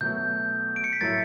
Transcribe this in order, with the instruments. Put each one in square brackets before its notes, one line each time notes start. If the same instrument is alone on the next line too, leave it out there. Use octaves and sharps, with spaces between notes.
[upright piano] B2 F#3 A3 [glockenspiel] G6
[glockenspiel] D7
C#7
B6
[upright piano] A2 F#3 A3 E4 [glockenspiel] A6